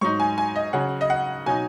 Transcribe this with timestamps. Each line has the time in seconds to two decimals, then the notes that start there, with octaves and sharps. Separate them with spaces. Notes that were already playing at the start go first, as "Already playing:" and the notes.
0.01 G#2 F#3 D#4 C#6
0.20 G#5
0.38 G#5
0.56 D#5
0.73 C#3 F#3 C#4 F#5
1.01 D#5
1.10 F#5
1.46 B2 F#3 D#4 G#5